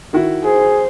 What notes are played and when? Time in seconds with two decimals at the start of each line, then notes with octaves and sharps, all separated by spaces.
0.13 D#3 E4 F#4
0.44 G#4 C5